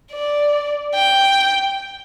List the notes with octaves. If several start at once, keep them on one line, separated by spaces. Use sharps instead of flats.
D5
G5